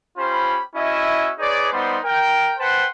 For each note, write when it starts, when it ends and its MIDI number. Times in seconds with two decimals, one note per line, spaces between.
0.17 0.58 61
0.17 0.58 65
0.17 0.58 67
0.17 0.58 72
0.17 0.58 83
0.75 1.30 61
0.75 1.30 64
0.75 1.30 66
0.75 1.30 75
0.75 1.30 76
1.38 1.68 63
1.38 1.68 68
1.38 1.68 71
1.38 1.68 73
1.38 1.68 74
1.71 1.98 55
1.71 1.98 59
1.71 1.98 63
1.71 1.98 72
1.71 1.98 74
1.71 1.98 84
2.03 2.53 70
2.03 2.53 79
2.58 2.85 71
2.58 2.85 72
2.58 2.85 78
2.58 2.85 79
2.58 2.85 81
2.58 2.85 84